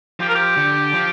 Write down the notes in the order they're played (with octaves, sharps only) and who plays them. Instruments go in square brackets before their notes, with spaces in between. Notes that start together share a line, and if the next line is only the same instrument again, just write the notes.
[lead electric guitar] F3 [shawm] G4
[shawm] A#4
G4
[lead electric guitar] D3
F3